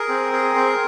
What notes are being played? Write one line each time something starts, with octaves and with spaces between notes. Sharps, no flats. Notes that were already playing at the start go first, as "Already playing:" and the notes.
Already playing: G#4 A#4
C4
G#4
C4